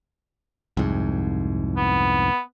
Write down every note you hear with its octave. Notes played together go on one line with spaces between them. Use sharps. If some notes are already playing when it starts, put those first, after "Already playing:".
C2 F2 G#2
B3